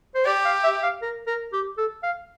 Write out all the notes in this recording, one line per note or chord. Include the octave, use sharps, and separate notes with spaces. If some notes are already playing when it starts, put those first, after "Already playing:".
C5
G4 D5
F5
E5
F5
A#4
A#4
G4
A4
F5